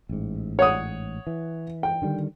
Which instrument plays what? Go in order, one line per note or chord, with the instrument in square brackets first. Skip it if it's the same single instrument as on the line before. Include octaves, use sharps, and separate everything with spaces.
[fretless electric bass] A1 G#2
[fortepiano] C#5 F#5 D#6
[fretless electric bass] E3
[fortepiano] G5
[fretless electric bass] D3 D#3 G3